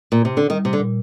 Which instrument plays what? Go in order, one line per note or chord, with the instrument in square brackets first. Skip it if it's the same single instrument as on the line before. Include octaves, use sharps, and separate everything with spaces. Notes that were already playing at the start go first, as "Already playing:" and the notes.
[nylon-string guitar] A#2
C3
D3
[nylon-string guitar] D#3 [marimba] G3
[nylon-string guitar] C3
D3
[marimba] A#2